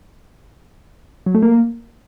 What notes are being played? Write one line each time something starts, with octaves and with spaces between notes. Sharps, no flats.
F#3
A3
A#3